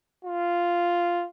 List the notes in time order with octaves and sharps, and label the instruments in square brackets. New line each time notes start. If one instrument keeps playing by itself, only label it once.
[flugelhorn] F4